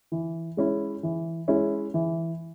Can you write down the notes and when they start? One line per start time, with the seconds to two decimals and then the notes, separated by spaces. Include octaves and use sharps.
0.12 E3
0.57 G#3 C#4 E4
1.03 E3
1.48 G#3 C#4 E4
1.94 E3